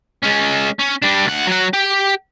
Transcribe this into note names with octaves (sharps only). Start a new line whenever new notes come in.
G#3 C#4
C#4
G3 D4
D2 F#5
F#3 F#5
G4